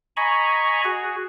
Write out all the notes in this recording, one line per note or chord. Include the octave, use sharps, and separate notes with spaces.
D#5 G#5 A#5 B5 C#6
F#4 G#4